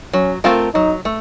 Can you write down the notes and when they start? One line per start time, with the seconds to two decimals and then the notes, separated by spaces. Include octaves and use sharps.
0.13 F#3 C#4
0.44 A3 C4 F4 A#4
0.74 F#3 D#4
1.05 A3